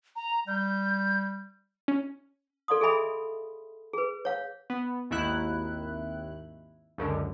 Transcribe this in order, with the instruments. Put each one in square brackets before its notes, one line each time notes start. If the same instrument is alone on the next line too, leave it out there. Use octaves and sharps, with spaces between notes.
[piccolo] A#5
[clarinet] G3 [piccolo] G6
[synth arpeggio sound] C#4
[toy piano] A4 D5 F5 C6 D#6
G#4 A4 D#5 E5 G#5 B5
G#4 B4
C#5 F5
[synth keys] B3
G#1 D#2 D#3 E4 F#6
C#2 F#2 D3